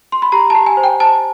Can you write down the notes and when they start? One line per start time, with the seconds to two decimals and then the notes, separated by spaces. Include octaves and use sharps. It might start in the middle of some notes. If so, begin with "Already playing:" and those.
0.12 C6
0.22 B5
0.32 G4 A#5
0.50 G4 A5
0.66 G#5
0.77 C5
0.84 G5
1.00 C5 A5